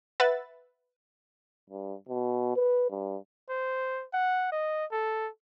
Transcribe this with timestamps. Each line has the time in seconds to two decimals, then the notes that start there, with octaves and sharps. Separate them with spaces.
0.20 B4 E5 F#5 A6
1.70 G2
2.09 B2
2.56 B4
2.90 G2
3.49 C5
4.13 F#5
4.52 D#5
4.92 A4